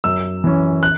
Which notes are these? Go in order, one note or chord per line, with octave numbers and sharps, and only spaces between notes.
F#2 E6
E3 C#4
F#6